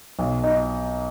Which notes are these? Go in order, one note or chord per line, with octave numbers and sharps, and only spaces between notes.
B1
D#4